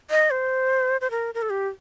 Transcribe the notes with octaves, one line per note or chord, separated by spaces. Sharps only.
D#5
C5
C5
A#4
A#4
A4
G4